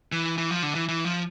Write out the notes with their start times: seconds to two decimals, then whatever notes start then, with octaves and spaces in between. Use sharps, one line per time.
0.12 E3
0.38 E3
0.51 F3
0.63 D3
0.75 E3
0.88 E3
1.05 F3